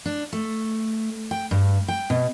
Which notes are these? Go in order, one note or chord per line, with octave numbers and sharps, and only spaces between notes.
D4
A3
G5
G2
G5
B2